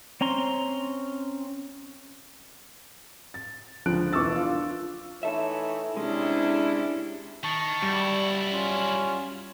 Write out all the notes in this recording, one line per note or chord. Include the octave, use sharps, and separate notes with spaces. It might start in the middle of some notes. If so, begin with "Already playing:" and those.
C4 C#4 A#5 C6
A6
C#2 D3 F3 F#6 D7
E1 E3 C#6 D6 E6 A6
D4 F4
E3 D#4 A4 C#5 E5
C3 G#3 C#4 D4 E4
D#3 A5 C#6
F#2 G3 E4
C#4 F4